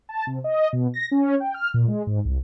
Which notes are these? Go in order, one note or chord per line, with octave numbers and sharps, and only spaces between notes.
A5
C3
D#5
B2
A#6
C#4
G5
F6
A#2
G#3
G#2
C2